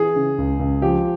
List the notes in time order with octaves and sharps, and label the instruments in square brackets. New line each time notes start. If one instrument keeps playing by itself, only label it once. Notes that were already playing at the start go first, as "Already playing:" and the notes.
Already playing: [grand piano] E3 [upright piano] G#4
[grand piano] C#3
C#2
C#2
[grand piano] F3 [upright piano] G4